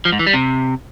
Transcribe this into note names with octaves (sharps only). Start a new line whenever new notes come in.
F3
G#2
E3
G3
C3